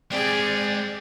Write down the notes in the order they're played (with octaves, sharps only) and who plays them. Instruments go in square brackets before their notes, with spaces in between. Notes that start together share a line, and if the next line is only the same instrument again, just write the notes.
[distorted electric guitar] G#3 G5 [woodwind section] C4 G4 [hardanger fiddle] G#4 [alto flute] D5